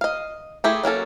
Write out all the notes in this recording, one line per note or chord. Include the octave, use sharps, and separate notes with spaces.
D#5 F5
A3 E4 G4 G#4
F#3 A#3 C#4 A4